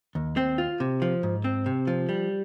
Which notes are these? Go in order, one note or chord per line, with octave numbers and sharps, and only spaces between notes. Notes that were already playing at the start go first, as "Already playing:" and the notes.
D#2
C4
F4
C3
F3
G#2
C4
C3
F3
G3